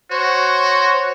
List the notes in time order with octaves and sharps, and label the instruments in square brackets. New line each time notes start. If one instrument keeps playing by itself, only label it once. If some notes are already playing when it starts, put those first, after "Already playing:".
[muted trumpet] F#4 [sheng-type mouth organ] C5 C#5